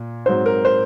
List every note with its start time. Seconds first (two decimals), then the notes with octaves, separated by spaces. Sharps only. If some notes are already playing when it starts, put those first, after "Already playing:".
Already playing: A#2
0.26 G#2 F#3 C4 C5
0.46 A#4
0.65 C5